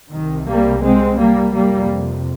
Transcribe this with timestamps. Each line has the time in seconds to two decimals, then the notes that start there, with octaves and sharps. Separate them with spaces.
0.12 C2 C3 D#3
0.47 G3 A#3
0.83 G#3 C4
1.18 G3 A#3
1.54 F2 C3 G3 A#3